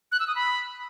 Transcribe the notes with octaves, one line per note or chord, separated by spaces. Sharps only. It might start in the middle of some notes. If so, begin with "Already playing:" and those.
F#6
E6
D#6
B5